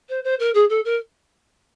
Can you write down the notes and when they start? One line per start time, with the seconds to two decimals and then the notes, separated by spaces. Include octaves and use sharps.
0.09 C5
0.24 C5
0.39 A#4
0.54 G#4
0.69 A4
0.85 A#4